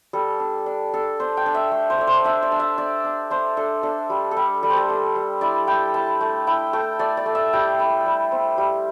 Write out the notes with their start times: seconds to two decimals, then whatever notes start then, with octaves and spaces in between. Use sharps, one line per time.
0.13 G3 A4
0.40 D4
0.66 D4
0.94 D4 A4
1.20 D4 C5
1.37 G5
1.46 D4
1.54 E5
1.72 A3
1.90 C5
1.98 A3 D5
2.07 C5
2.24 D4 E5
2.43 D5
2.52 D4
2.60 E5
2.78 D4 D5
3.04 D4
3.30 D4 C5
3.57 D4 A4
3.83 D4 A4
4.10 G3
4.31 A4
4.37 G3 G4
4.63 G3 A4
4.70 C5
4.77 A4
4.89 D4
5.16 G3
5.41 E4 D5
5.67 E4 G5
5.94 E4 A5
6.21 A3
6.47 E4 G5
6.73 A3 G5
6.99 A3 D5
7.17 D5
7.26 A3
7.35 E5
7.53 G3 G5
7.80 E4
8.06 G3
8.32 C4
8.58 G3